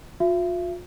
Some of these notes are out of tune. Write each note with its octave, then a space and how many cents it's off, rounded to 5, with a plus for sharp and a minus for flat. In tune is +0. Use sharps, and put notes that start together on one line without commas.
F4 +40 E5 +40